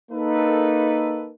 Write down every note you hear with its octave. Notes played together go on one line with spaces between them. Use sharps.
A#3 D#4 A4 B4